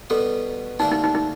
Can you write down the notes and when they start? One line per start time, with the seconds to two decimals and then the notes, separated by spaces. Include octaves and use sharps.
0.10 B2 G3 B3 A4
0.79 D2 D3 G3 A#3 D4 D#4
0.92 D#4
1.04 D#4
1.15 D#4